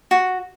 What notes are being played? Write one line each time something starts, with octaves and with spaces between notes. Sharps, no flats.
F#4